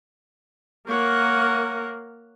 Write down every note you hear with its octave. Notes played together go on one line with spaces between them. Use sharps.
A#3 A#4 C#5 F#5